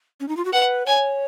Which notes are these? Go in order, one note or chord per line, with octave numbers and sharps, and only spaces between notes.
C#4
D#4
F4
F#4
B4 F#5
C#5 G#5